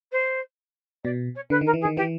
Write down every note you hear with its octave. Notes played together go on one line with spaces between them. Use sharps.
C5
B2 D5
C#5
D3 B4
D#3 A#4
E3
G#4
D#3
E3 G4